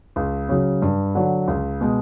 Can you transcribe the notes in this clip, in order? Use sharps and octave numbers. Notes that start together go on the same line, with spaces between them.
C#2
C#3 F#3
G2
D3 F#3
C#2
B2 G#3